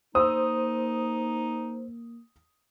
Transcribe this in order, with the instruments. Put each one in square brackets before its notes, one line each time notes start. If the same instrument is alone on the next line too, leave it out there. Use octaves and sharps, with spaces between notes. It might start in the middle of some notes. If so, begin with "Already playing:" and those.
[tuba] A#3 [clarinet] D#4 [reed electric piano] C5 [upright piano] D#6 E6